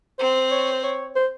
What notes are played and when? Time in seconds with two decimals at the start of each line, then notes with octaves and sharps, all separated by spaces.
0.19 C4 C5
0.52 C#5
0.72 C5
0.84 C#5
1.16 C5